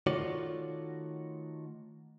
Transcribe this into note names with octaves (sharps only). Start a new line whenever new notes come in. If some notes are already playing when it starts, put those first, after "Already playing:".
D#3 A3 F4 F#4 C#5 D5